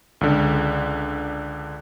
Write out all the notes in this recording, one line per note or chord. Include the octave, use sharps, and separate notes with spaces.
C#2 D3